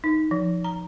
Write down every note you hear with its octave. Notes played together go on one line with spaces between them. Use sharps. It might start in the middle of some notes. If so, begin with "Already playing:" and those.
D#4
F3
A#5